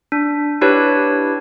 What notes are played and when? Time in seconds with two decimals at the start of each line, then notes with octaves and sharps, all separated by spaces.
0.12 D4
0.61 D4 E4 G4 B4 C#5